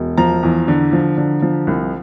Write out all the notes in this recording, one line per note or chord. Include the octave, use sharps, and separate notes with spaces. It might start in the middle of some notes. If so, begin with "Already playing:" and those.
Already playing: E1
F3 A#5
E2
D3
F3
D3
F3
C2